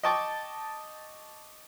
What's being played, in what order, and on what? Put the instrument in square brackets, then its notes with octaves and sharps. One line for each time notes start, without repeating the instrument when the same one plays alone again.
[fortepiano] D#5 G5 A5 C#6 D6